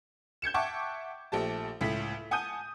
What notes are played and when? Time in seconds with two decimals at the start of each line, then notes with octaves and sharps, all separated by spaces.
0.42 G6 G#6 C#7 E7
0.54 E5 F#5 G5 A5 C#6 D6
1.32 A#1 A3 G4 A5
1.81 C#2 A2 B6
2.31 F#5 G#5 A5 D#6 G6 D#7